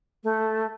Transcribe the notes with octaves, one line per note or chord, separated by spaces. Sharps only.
A3